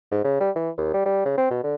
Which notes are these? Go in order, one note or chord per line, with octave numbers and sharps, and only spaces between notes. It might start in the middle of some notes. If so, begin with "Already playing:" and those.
G#2
C#3
G3
E3
D#2
G3
G3
C#3
C4
B2
D3